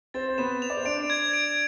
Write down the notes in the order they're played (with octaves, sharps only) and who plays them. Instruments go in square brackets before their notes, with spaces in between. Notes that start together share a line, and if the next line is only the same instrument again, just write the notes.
[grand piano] C4 C5 [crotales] A6
[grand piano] C5
[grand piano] B3 B4 [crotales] E7
[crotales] F7
[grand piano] D5
C5
[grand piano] D4 D5 [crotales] D7
[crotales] G#6
D7